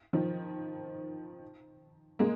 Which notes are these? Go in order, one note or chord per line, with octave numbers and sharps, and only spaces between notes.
D#3 F3
G#3 A#3